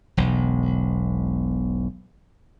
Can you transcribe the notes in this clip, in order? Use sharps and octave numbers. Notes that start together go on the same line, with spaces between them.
E1 B1